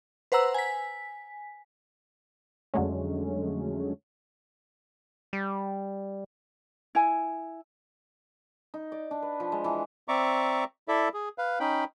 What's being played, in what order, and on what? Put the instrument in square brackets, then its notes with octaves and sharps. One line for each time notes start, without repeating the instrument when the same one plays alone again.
[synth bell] B4 C5 F#5 A#5 E6
G#5 B6
[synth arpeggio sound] F2 D3 F#3 G#3 A3 C#4
[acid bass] G3
[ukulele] E4 G#5
[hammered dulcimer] D#4
D5
D4
B4
F3
G#3
E3
[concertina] C4 D5 E5 A#5 C#6 D6
E4 A4 D5 E5
G#4
B4 F5
C#4 D#4 G5 B5